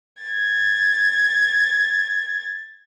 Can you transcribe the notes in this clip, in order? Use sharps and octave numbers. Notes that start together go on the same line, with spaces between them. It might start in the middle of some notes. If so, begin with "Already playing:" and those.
G#6 A6